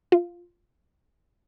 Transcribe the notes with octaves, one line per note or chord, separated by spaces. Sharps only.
F4